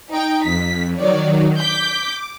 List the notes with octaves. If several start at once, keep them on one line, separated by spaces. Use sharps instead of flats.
D#4 G5
F2 B6
D#3 F#3 C#5 D5
D6 G6 B6